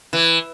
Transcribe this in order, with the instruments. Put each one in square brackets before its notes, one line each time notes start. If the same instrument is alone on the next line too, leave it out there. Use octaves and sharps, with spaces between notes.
[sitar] E3